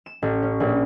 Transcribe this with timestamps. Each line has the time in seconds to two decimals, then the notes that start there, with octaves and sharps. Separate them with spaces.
0.06 E7
0.22 A1
0.42 C#4
0.60 A#1